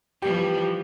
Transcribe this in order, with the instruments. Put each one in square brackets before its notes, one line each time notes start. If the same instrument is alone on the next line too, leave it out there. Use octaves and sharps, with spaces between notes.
[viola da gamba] E3 F3 G3 [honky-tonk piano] G4